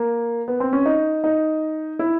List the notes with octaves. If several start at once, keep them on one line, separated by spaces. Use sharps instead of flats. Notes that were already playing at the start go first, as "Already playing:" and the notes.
Already playing: A#3
B3
C4
C#4
D#4
D#4
E4